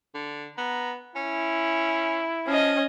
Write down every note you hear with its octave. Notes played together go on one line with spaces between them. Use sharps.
D3
B3 A#5
C#4 E4
F3 C#4 D#5